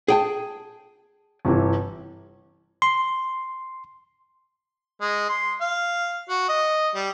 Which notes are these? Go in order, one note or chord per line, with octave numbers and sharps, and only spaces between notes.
G#4 G5 A5
G1 C3 E3
C6
G#3
C6
F5
F#4
D#5
G3